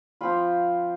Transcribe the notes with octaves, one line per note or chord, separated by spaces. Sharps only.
F3 C4 F4 B5